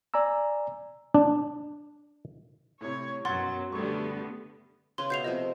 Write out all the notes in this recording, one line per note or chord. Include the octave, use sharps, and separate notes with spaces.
D5 G#5 A#5 E6
D4
A2 C3 C#5
F#2 B2 F#3 F#5 C6 G#6 A6
D3 G3 A3 B3 C#6 G#6
C#3 G#4 B4 C6
B2 E5 G6 C7 F7
C3 F3 A3 D#5